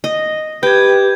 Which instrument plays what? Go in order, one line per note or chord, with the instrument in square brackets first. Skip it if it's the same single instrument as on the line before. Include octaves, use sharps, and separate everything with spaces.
[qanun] D#5
[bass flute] G4 [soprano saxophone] B4 [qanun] G5 [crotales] G6 G#6